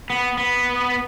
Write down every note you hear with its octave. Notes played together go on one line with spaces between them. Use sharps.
B3
B3